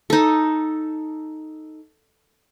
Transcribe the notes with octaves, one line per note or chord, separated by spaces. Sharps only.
D#4 A4